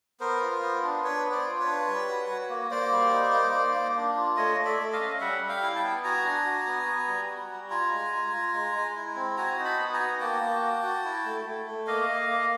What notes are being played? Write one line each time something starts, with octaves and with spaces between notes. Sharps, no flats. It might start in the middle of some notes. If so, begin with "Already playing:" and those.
B3 A#4 C5
F4
B3
D4
D4 B4 C#5
B3
C5 D5
F4
B4 C#5
D4
G3
F#4
F#4
A#3
A#3 C5 D5
G3
D#4
A#3
A#3
A#3
D4
F4
A3 C#5 D#5
A3
D5 E5
A3
D#5 F5
C#4
G3 E5 F#5
G3
F5 G5
E4
G5 A5
B3
F#4 G#5 A#5
D4
F#4
B3
B3
G3
F#4
G3
F4 G#5 A#5
G#3
F4
F4
G#3
G#3
E4
C4
F#4 G#5 A#5
D#4
A5 B5
B3
G#5 A#5
F#4
A#3 G5 A5
A#3
F#4
F#4
E4
A3
A3
A3
A#3 D#5 F5
A#3
A#3